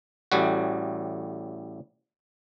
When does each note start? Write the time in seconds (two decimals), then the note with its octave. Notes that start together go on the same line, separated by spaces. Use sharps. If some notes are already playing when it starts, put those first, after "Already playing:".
0.32 A1 A2 G3 F#4